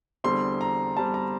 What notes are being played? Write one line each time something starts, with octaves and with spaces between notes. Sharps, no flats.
E2 D3 G3 C4 C6
A#5
E2 D3 G3 C4 A5
A#5